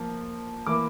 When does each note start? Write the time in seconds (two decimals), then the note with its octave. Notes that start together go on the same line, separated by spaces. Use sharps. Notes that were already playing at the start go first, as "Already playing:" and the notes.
Already playing: F3 A#3
0.67 E3 A#3 E4 D6